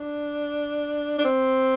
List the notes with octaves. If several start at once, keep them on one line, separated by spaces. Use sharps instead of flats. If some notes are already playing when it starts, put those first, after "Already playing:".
Already playing: D4
D4
C4